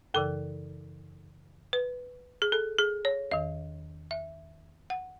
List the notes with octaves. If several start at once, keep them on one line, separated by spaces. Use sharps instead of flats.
F#2 C#3 E3 A4
B4
G#4
A4
G#4
C#5
E2 D#3 D#5
E5
F#5